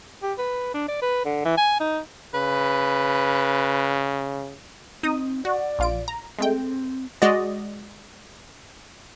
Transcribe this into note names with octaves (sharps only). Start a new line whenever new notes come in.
G4
B4
D4
D5
B4
D3
E3
G#5
D#4
C#3 B4
C4 D#4 D#6
F#4 D5
A#1 F4 D7
A#5
G#3 A3 C4 G5
G#3 F#4 D5 D#5